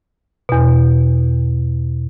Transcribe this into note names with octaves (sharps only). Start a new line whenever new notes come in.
E2 B2